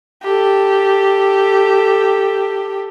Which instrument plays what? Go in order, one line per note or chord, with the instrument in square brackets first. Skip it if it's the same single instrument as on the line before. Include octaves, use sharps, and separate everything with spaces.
[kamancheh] G4 A4